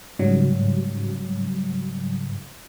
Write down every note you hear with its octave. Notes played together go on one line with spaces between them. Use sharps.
G#2 C#3 F#3 G3